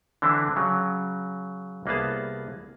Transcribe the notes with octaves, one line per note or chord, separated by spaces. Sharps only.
D3 E3 C4 D4 E4
C#3 F#3
C2 A#3 B3 G#4 A5